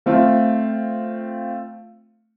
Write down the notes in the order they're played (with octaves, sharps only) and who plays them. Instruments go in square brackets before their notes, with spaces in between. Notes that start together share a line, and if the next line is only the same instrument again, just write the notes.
[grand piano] A3 C4 F4